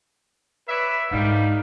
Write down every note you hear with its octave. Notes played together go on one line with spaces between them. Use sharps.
B4 C#5 D5 E5
G#2 D3 F3 G3 G#3 D#4 F5